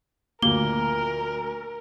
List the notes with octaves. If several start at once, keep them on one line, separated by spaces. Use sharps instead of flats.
D2 A#2 F3 A#3 A#4 G7